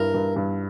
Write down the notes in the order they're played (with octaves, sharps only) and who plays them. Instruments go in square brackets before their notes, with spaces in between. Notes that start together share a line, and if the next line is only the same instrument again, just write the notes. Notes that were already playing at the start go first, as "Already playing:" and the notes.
Already playing: [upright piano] G2 E4 [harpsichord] A#4
[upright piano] G2
G2